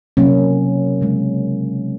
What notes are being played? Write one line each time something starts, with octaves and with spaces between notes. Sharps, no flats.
C3 F#3 A#3 C#4
C#3 G#3